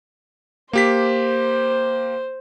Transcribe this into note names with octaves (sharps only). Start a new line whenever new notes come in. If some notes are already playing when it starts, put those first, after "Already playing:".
A#3 G4 C5 B6